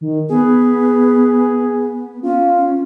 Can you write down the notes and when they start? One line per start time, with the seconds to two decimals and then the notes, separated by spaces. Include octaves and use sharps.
0.01 D#3
0.30 B3 G#4
2.23 C#4 F4